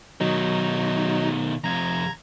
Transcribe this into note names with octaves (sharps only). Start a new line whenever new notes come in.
B2 D#3 F#3 D#4
F2 C3 A#5 G#6